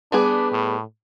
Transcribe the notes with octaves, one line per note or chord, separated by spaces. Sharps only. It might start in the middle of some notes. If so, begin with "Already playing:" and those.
G3 B3 D4 G#4
A2